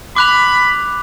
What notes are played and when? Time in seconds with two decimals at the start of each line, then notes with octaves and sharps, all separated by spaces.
0.16 B5 D6 F#6 F7